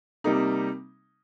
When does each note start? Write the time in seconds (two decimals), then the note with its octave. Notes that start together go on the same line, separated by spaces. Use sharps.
0.24 C3 G3 A#3 D#4